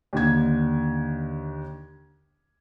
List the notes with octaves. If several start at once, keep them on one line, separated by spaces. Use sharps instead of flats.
D#2 D3 G#6